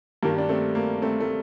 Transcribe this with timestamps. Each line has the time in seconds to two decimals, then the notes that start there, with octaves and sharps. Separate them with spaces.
0.22 G2 D#3 G3 A#3
0.38 D4
0.49 A3 C4
0.75 A#3
1.02 A3 C4
1.20 A3